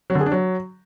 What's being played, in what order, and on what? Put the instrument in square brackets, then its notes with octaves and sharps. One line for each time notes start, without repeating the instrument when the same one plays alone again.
[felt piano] F#3
D3
G#4
D4
F#3